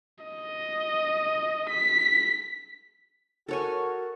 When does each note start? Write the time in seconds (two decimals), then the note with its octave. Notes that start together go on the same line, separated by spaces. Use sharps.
0.25 D#5
1.70 B6
3.49 F#4 A4 A#4 C#5 G#5